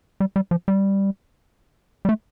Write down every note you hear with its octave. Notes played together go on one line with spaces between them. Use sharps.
G3
G3
F3
G3
G3
A3